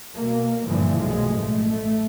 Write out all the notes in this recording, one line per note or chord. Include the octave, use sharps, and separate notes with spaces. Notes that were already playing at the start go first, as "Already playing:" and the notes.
B2 A#3
G2 A#2 D3 E3 F3
B1 F#2 F3 G#3 A3
A1 A3
A3